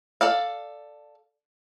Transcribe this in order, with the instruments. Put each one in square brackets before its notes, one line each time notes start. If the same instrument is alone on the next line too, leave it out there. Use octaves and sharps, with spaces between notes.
[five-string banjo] A4 D5 F5